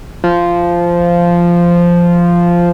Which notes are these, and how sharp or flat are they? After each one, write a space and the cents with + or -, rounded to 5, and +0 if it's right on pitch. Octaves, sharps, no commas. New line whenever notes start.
F3 -10